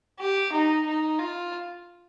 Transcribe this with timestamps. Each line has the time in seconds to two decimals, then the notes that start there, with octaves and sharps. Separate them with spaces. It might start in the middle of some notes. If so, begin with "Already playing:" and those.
0.20 G4
0.53 D#4
0.86 D#4
1.19 F4